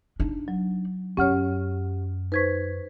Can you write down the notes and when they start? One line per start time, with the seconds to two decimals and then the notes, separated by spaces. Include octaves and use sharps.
0.20 D4 D#4
0.48 F#3
1.17 F#2 C#4 G4 C#5 F#5 F6
2.32 D#4 B4 C5 C#6 G#6 B6